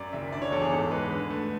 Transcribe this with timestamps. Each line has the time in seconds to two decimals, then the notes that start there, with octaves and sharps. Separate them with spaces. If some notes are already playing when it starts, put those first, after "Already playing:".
Already playing: F#2 D5
0.13 F#1 E5
0.32 D3 D5
0.42 C#5
0.51 E2 A4
0.61 G#4
0.71 G#2 A4
0.91 G#3 B4
1.11 D3 B4
1.30 A3